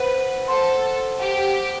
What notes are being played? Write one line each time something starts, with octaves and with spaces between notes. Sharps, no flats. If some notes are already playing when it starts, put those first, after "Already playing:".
Already playing: B4 C5 F#5 B5
A4 C5 F#5 C6
G4 C5 F#5 A5